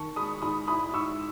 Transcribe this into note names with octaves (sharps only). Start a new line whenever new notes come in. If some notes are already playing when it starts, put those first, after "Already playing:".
Already playing: D#3 A5 C#6
G#3 B5 D#6
G#2 B5 D#6
E4 B5 D#6
G#2 C#6 E6